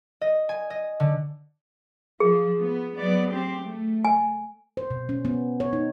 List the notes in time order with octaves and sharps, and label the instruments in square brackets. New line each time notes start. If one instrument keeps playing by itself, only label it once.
[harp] D#5
G#5
D#5
D3
[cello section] F3 [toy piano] G#4
[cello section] B3
F#3 B3 D5
C4 G4
A3
[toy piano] G#5
[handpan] C5
B2
C#4
B3
C#5
D#4